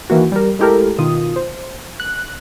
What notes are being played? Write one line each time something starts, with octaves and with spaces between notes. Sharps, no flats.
D#3 E3 A#3 F#4
G3 A#4
G#3 A3 E4 G4 A4 A#4
B2 D#3 F4 D#6
C5
F#6